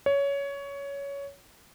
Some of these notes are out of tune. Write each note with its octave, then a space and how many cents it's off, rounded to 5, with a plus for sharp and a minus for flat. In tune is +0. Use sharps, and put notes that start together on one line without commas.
C#5 +15